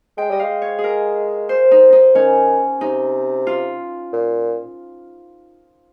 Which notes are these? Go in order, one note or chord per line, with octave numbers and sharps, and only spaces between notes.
G#3 G5
G3 D#5
G#3 F5
C#5
G#4
A#4
C5
D#4
D#4
D#3 C#4
C3 D#4
F4
A#2